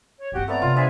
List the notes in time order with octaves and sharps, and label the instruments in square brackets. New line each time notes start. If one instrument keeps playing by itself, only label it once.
[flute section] C#5
[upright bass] G1 C4 [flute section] F#4 G4
[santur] A3 B3 C#5 [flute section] D5 A#5
[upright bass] C3 [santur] F4
[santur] G#3 C4 D4 [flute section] G#4 D5 E5